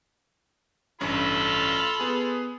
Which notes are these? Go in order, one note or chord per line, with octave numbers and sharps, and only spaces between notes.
A1 G2 C#4 F4 A4 B5
B3 G#4